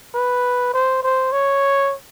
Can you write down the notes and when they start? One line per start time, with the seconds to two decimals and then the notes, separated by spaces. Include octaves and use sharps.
0.15 B4
0.74 C5
1.03 C5
1.32 C#5